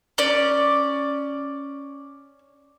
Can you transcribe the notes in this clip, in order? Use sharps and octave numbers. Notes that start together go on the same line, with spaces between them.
C#4 D5